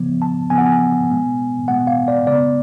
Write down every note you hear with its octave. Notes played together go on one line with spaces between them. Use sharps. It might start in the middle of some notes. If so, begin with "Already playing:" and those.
Already playing: C#3 F3 B3
A5
C#3 F3 B3 G#5
F#5
G#5
B2 G#3 B3
B2 G#3 B3 F#5
F5
D5
C#3 G#3 B3 D5